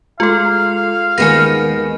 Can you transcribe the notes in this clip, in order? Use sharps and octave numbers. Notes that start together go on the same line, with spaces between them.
G#3 F4 A4 F5 C6
D#2 D#3 G#3 B3 G#5 A#6 E7